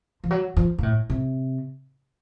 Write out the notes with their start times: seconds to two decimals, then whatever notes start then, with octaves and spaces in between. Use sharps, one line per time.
0.24 F3
0.31 F#3
0.56 F3
0.78 A#2
0.83 A2
1.10 C3